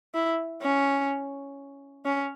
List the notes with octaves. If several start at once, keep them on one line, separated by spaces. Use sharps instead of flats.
E4
C#4
C#4